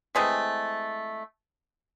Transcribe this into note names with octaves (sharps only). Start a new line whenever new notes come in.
E3 G#3 A3 C4